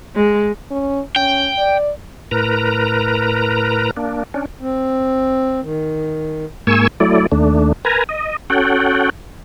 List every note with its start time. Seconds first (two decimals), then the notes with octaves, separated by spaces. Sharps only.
0.16 G#3
0.71 C#4
1.16 C#4 G5
1.58 D5
2.31 A2 A#4 B4 A#5
3.97 A#3 D4
4.34 C#4 D4
4.61 C4
5.62 D#3
6.67 G#2 A#3 G#5 C#6 E6
7.00 F#3 A3 E4 D5
7.32 D#2 A3 D4
7.85 A#4 B4 G#5 A#5
8.09 D#5
8.50 C#4 F#4 A4 F#5 G5